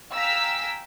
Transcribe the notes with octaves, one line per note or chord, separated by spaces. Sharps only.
F5 G5 G#5 A#5 E6 B6